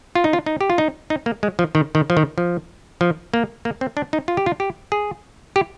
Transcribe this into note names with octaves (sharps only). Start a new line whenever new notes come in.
F4
D#4
F4
D#4
G4
F4
D#4
D#4
A#3
G#3
F3
D#3
D#3
F3
D#3
F3
F3
A#3
A#3
C4
D4
D#4
F4
G4
F4
G4
G#4
G4